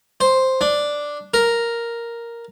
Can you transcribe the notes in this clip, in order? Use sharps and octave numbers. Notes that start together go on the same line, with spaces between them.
C5
D4
A#4